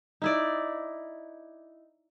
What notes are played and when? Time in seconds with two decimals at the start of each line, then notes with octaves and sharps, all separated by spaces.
0.22 D#4 E4 D5